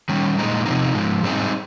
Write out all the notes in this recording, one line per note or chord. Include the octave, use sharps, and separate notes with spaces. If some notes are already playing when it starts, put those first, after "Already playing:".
D#3 G3 C#4
A#2 G#3 D#4
C3 F3 C4 D#4
G#2 F3 G#3
G#2 G3 C4 D#4 G#4